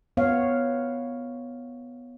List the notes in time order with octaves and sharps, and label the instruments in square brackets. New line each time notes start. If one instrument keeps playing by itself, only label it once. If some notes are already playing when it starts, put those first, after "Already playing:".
[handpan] B3 C#5 F5